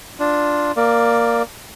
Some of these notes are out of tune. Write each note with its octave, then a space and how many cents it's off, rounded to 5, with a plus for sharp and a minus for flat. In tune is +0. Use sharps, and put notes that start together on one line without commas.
D4 +0 F4 +0
A#3 +0 D5 +10